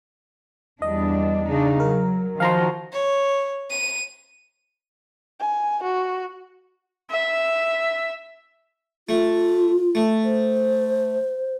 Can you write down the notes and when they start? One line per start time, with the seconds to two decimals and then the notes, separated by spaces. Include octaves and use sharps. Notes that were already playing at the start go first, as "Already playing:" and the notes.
0.82 E2 G3 D4 D#5
1.48 C#3 D4 D#4
1.80 F#3 A#4
2.40 D#3 F3 F4 F#4 F5 A#5 C6
2.93 C#5
3.70 D#7
5.40 G#5
5.83 F#4
7.11 E5
9.09 A3 F4
9.95 A3
10.24 C5